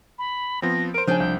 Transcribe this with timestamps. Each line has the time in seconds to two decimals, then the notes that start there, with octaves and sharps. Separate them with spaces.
0.19 B5
0.62 F3 B3 C4 A#6
0.94 A#4 C5 D7
1.07 C#3 F3 D4 G5 G#5 G6
1.20 C2 G6